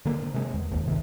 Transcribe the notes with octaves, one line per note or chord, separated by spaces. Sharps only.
D3 A#3
C3 G#3
E2
A#1 D#2
E2 G2 C3 D#3